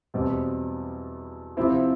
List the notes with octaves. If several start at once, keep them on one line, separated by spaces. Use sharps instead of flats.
E2 B2 G3 C4
C3 F3 C4 E4